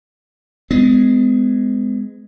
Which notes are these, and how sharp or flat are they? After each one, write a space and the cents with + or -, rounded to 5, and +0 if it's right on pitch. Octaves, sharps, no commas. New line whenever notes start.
G#3 +0 B3 +40